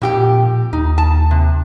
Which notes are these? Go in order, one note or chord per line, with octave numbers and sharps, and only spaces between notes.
F2 A#2 G4 G5
D#2 D#4
A5
C3